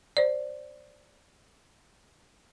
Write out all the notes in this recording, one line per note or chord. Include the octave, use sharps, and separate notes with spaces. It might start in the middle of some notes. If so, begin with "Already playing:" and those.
C5 D5